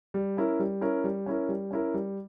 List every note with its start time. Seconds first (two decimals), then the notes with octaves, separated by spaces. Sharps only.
0.14 G3
0.37 C#4 E4 A#4
0.59 G3
0.81 C#4 E4 A#4
1.04 G3
1.26 C#4 E4 A#4
1.49 G3
1.71 C#4 E4 A#4
1.94 G3